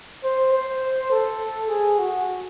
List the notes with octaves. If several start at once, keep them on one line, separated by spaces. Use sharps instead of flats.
C5
C5
A4
G#4
F#4